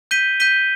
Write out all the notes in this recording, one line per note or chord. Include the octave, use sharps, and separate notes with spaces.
G6 B6 D#7 G7
G6 B6 D#7 G7